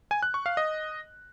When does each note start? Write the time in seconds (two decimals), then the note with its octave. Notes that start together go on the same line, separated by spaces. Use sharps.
0.11 G#5
0.23 F#6
0.34 C#6
0.46 F5
0.57 D#5